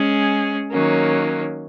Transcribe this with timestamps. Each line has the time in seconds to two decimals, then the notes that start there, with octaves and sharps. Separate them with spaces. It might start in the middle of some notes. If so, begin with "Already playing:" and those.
Already playing: G#3 C#4 G#4
0.71 D#3 F#3 A#3 C#4